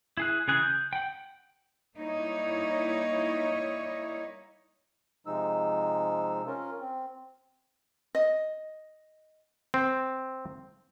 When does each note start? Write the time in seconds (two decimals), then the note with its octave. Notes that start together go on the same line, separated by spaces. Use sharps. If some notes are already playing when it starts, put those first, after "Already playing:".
0.17 E4 G#4 F#6
0.48 C#3 E3 G#4 F#6
0.63 G6
0.93 F#5 G5
1.97 G3 A#3 D#4 E4 C#5
5.26 C3 F3 G#3 D#4 E6
6.47 C#4 F4 A#4
6.80 C4
8.15 D#5
9.74 C4